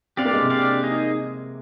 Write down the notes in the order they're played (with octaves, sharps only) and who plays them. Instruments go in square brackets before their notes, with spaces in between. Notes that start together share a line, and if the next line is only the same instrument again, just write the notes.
[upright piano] C4 [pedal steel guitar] D4 G4 D5 F5
[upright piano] A#3
G#3
C3
[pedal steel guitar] D4 G4 D5 F5
A#3 D#4 G#4 D#5